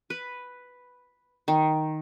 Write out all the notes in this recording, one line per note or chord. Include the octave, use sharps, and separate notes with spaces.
B4
D#3